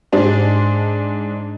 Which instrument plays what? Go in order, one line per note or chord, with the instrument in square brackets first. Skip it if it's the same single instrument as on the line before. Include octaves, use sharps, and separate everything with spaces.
[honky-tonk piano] G#2 G#3 D4 C5